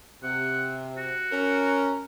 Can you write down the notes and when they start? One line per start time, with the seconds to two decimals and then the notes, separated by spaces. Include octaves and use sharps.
0.23 C3 F#5
0.97 F#4
1.32 C#4 A#4